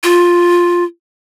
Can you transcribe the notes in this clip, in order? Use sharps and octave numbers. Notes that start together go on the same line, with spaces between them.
F4